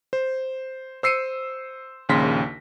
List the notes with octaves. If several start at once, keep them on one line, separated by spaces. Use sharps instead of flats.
C5
C5 E6 C7 C#7 D#7
A#1 D#2 C#3 C6 A#6 B6